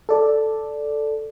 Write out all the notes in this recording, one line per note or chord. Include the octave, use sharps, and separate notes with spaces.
A4 D5